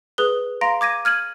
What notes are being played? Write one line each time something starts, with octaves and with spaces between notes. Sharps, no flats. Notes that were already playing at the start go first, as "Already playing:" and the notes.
G#4 B4 D#6 F#6 G7
F5 A#5 C6 A#6 D7
D6 G#6 A#6 D#7
F6 G#6 D#7 F#7